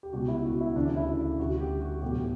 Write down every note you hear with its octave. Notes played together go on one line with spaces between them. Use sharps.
G4
C#2 B2 G3 F#4
E4
F#4
E4
D2 C#3 E3 D4
E4
D2 D3 G3 F#4
G4
F#4
B1 A2 E3 G3 G4